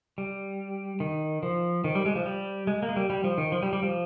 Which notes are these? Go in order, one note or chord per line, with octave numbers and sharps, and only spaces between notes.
G3
D#3
F3
D#3
G3
G#3
F3
G3
G#3
A#3
G#3
G3
G3
F3
D#3
F3
G3
G3
F3